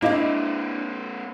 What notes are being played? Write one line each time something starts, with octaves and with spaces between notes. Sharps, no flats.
A#3 C4 D4 E4 G4 D#5 F5